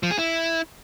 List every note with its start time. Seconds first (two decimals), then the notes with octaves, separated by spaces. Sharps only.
0.03 F3
0.11 G#4
0.19 E4